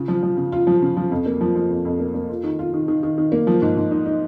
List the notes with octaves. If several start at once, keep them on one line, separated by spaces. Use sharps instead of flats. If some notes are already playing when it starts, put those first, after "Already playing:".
Already playing: C#3 F4
F3
F3
C#3
F4
F3
C#3
F3
F2
A#3
F3
F3
F2
F2
A#3
A#3
F4
D#3
F4
D#3
D#3
D#3
D#3
A#3
F3
G#2
G#2
D#4
D#4